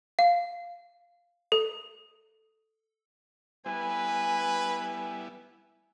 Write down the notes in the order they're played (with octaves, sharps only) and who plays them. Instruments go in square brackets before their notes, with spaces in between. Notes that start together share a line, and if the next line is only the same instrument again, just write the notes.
[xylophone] F5
A4
[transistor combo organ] G3 B3 E4 [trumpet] B4 [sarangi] G#5